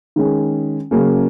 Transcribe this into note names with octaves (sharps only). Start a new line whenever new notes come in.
D#3 G#3 C#4 G#4
C#3 F#3 A#3 C#4